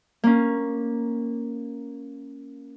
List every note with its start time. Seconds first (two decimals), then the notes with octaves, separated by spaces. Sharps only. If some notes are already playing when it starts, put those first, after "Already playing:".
0.24 A#3 C#4